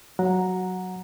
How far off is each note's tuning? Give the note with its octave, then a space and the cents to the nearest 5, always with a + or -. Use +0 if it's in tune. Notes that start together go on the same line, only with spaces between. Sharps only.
F#3 +0 F#5 -15 A#5 +0